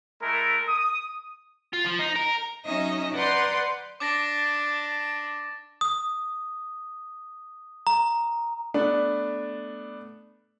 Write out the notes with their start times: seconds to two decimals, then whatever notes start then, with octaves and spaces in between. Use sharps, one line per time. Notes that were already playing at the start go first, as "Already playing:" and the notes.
0.21 G#3 A3 E4 A#4
0.68 D#6
1.73 F4
1.86 F3
1.99 D#4
2.15 A#4
2.66 F#3 C#4 D#4 D#5 E5
3.14 B4 D5 F#5 A#5 C6 G6
4.00 D4 D6 A6 A#6
5.81 D#6
7.87 A#5
8.74 A3 B3 D4